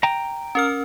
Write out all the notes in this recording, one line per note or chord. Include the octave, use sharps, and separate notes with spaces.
G5 A#5
C#4 A#4 F6